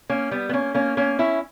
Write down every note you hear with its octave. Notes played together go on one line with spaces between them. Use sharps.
A#3 C#4
G3 B3
B3
A#3 C#4
A#3 C#4
A#3 C#4
C#4 E4